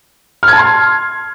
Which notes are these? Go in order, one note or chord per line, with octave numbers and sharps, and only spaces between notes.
F6
G#6
A5
C6